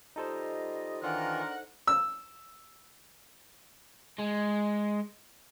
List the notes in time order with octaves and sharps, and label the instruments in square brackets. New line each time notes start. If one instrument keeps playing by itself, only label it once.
[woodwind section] G3 F4 D#5 [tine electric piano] D#4 A4 C5
[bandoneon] D#3 E3 F4 [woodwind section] D4 A#4 [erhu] F#5
[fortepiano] E6
[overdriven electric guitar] G#3